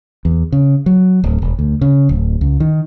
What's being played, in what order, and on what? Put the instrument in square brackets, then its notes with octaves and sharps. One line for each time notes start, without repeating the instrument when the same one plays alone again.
[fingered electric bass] E2
C#3
F#3
D1
E1
D2
C#3
D1
C#2
D#3